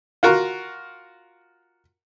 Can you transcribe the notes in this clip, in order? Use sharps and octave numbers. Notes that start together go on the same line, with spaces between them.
F4 F#4 A#4